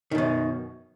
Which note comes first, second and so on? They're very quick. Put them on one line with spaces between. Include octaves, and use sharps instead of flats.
D#3 B2 F#2